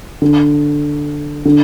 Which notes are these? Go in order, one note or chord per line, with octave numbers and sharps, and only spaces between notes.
D3
D3